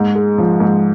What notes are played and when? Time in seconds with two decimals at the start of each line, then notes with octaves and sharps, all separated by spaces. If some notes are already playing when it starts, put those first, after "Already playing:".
Already playing: G#2
0.15 G#3
0.38 F3
0.60 G#2